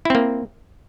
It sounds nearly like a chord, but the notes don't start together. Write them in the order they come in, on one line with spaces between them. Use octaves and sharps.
E4 C4 A#3